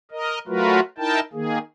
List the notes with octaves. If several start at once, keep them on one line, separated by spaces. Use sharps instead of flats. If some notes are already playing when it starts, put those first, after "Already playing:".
A#4 D#5
F#3 A3 F4 F#4 A#4 B4
D#4 E4 A#4 G5 A5
D#3 A#3 G#4